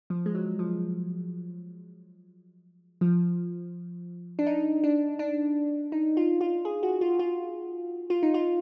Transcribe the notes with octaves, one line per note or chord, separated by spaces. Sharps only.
F3
G#3
F#3
F3
F3
D4
D#4
D4
D4
D#4
F4
F4
G#4
F#4
F4
F4
F4
D#4
F4